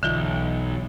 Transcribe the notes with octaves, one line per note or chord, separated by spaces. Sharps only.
B1 D3 E3 F4